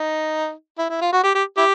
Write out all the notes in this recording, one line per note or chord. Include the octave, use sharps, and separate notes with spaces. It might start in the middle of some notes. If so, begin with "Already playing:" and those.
Already playing: D#4
E4
E4
F4
F#4
G4
G4
E4 G4